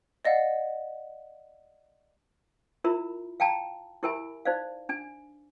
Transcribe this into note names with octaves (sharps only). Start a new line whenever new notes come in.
D5 D#5 F5 F#5
E4 F4 A#4 E5 A#5 B5
F5 G5 A5 A#5
E4 G4 A#4 E5 G#5 B5
D#4 C5 D5 F5
D4 G#5